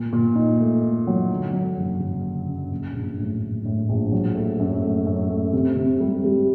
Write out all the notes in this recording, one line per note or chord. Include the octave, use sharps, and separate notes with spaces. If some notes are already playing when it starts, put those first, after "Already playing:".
Already playing: A#2
A#2
D#4
A3
A3
F#3
D3
F#3
F#1
F#1
D3
F#2
A#1
A#1
A2
A2
A2
A#1
F#3
A3
F#2
A3
F#2
A3
C3
C3
G3
G3